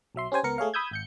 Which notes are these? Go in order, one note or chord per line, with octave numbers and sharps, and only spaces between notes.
B1 F#3 E5 C6
C#4 G4 C5 G#5
C#2 B3 A#4 C#7
A3 G#4 C#5 F5
B5 D#6 E6 G6 G#6
G#1 G6 C#7